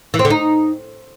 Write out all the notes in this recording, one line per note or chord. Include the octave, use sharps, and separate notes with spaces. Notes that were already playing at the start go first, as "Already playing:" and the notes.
E3
C4
D3
D#4